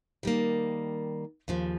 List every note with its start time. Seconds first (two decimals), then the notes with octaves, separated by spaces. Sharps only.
0.23 D#3 G3 A#3
1.48 D#2 C#3 F3